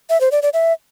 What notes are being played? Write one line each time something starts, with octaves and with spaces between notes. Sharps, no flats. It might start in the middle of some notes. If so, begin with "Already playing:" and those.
E5
C5
D5
D5
E5